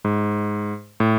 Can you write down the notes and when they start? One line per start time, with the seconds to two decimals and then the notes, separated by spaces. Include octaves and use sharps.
0.05 G#2
1.00 A2